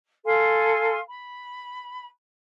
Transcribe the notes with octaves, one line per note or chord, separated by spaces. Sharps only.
A4 F5 G#5 C6
B5